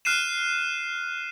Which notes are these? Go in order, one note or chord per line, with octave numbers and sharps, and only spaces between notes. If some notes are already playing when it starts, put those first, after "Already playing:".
F6 F#6 C7 D#7 E7